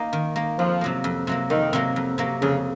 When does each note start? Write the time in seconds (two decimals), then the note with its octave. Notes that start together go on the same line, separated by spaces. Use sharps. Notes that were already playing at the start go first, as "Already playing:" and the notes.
Already playing: A#3 D#4
0.13 D#3
0.36 A#3 D#4
0.59 F2 F3
0.81 C3 F#3 A#3
1.04 F2
1.27 C3 F#3 A#3
1.50 F2 D#3
1.73 C3 F#3 A#3
1.96 F2
2.18 C3 F#3 A#3
2.42 F2 C#3